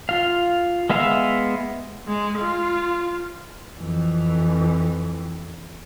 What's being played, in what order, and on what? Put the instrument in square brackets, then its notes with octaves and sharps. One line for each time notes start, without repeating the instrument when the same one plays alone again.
[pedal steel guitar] F4 F5
G#3 B3 E5 F5
[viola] G#3
F4
[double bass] F2 E3